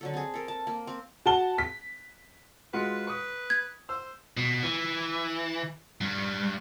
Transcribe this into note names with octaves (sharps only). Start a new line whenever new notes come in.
D3 F#3 A4
C4 G#4
A4 A#4
A5
A#3
C4
F#4 A5 G7
B6
G#3 F4 F#4 B4
B4 C#6 D#6
G#6
C5 E6
B2
E3
G2